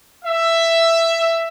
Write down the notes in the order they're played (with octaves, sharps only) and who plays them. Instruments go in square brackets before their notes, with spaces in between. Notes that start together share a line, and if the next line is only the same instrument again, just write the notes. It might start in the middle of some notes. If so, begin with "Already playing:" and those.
[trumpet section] E5